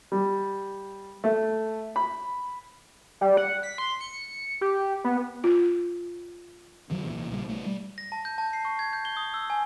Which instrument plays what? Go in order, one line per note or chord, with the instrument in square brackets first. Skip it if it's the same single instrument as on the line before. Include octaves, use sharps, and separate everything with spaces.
[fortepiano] G3
A3
B5
[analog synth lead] G3
F#5
B6
C6
C#7
G4
B3
[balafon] F4
[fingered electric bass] F#2 D#3 F3 F#3
D#1 C2 A#2 E3
A#1 C#3 E3 G3
B1 A3
G3
[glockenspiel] A#6
A5
G6
A5
C7
C#6
G#6
G6
G7
D#6
E6
G#5